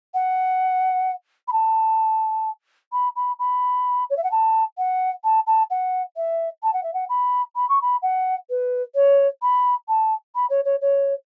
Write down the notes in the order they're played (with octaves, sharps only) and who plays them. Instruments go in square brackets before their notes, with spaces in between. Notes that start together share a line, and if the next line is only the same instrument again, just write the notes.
[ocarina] F#5
B5
A5
B5
B5
B5
C#5
E5
F#5
A5
F#5
A5
A5
F#5
E5
A5
F#5
E5
F#5
B5
B5
C#6
B5
F#5
B4
C#5
B5
A5
B5
C#5
C#5
C#5